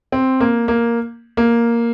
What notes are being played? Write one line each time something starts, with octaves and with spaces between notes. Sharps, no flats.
C4
A#3
A#3
A#3